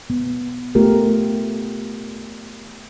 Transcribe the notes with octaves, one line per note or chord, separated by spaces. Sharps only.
B3
A3 B3 F4 G4 A#4